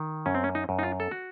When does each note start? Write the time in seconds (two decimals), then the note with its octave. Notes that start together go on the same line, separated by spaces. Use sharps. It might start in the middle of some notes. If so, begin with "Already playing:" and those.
Already playing: D#3
0.26 F#2 C#4
0.35 C4
0.44 C#4
0.55 D#4
0.69 F#2
0.79 D#4
0.83 F4
1.00 A4
1.11 F#4